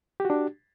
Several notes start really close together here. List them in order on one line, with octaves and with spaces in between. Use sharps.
G4 F#4 D4